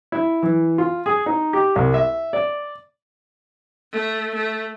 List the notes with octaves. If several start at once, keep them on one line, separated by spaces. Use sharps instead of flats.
E4
E3
F4
G#4
D#4
G4
C2
E5
D5
A3
A3